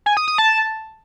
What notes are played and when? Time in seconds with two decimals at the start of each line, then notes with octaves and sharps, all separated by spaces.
0.06 G#5
0.17 D#6
0.28 D#6
0.38 A5